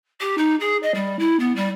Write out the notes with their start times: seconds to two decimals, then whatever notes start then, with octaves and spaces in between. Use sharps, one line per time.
0.20 G4
0.38 D#4
0.60 G#4
0.83 D#5
0.94 G3
1.19 E4
1.39 B3
1.56 G3